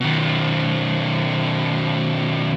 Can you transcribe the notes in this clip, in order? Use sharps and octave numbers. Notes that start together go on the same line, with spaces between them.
B2 D#3